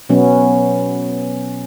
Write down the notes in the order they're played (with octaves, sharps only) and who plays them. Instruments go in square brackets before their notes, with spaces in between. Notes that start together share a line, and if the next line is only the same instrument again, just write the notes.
[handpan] B2 F#3 B3 C#4